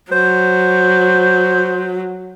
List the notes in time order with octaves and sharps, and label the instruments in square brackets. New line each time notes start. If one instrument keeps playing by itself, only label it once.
[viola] F#3 [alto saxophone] C5